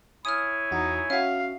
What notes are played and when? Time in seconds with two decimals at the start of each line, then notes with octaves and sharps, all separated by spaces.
0.25 E4 C#5 G#5 D#6 F6
0.71 E2 D#4 F#4
1.10 C#4 F#4 E5 F5